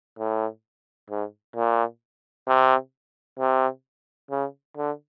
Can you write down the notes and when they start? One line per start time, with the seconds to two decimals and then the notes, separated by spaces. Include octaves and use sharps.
0.19 A2
1.10 G#2
1.56 A#2
2.48 C3
3.39 C3
4.31 C#3
4.77 D3